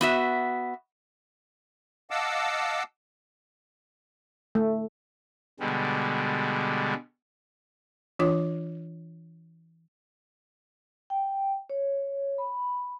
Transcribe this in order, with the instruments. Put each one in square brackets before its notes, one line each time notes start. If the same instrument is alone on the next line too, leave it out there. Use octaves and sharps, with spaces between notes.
[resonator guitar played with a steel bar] B3 F#4 E5
[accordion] D#5 F5 F#5 A5 D6 E6
[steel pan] A3
[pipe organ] B2 D3 G3 G#3
[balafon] E3 D4 F4 C#5 D6
[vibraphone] G5
C#5
B5